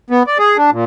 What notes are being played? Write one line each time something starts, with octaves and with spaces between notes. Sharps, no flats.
B3
D5
G#4
D4
A#2